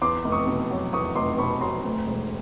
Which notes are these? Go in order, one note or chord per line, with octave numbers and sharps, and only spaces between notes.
E2 C6 D6
F1
C#6 D#6
B2
F#3
E2 C#6 D#6
F1 C6 D6
B2 B5 C#6
F#3 A#5 C6
D2
E1